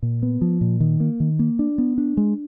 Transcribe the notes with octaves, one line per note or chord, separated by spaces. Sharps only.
A#2
B3
F3
A#2
D#3
A#3
D#3
A#3
D4
B3
D4
G#3